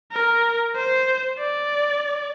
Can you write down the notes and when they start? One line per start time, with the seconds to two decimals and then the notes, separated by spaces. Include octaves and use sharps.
0.12 A#4
0.75 C5
1.39 D5